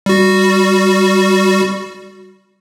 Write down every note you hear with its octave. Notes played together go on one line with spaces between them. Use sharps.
G3 F#4